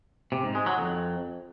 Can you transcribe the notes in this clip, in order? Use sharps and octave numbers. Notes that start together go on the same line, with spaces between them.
C3
G#2
G#3
F#3
F2